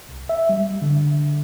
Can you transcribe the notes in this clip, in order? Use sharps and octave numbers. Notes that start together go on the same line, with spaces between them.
C2
E5
G3
D3